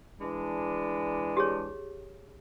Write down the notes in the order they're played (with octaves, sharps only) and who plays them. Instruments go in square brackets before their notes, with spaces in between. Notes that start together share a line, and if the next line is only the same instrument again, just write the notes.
[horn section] E3 G#3 D4
[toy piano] G4 G#4 C#5